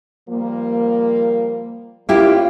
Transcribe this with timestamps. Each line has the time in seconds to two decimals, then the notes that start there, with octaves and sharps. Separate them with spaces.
0.29 F3 G3 A#3
2.09 G3 A#3 C#4 E4 F4 G4